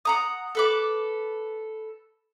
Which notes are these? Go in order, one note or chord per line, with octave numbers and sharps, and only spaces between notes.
F#5 A#5 D#6
A4 B4 D6